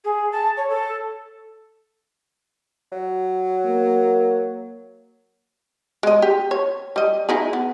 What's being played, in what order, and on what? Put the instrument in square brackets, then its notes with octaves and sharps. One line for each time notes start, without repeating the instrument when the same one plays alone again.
[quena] G#4
A5
C#5
A4
[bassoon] F#3
[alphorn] A#3
[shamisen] G#3 D#5
G4
C#5
G3 D#5
D#4 E4 G#4
B3